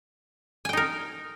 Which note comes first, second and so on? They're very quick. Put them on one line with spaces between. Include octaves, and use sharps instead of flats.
G#5 G5 D#4 A#4